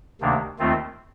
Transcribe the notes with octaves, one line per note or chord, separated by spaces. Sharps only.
D2 C3 D#3 A#3 D4
D#2 D#3 A3 C4 F4